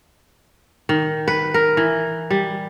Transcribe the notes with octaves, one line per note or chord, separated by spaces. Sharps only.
D#3
B4
A#4
E3
G3